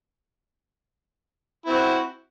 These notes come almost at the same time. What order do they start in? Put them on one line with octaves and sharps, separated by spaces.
E4 C4 F#4